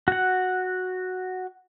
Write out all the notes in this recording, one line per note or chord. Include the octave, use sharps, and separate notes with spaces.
F#4 F#5